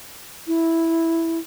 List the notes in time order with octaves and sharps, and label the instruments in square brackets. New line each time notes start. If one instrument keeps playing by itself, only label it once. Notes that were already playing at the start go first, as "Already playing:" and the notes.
[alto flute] E4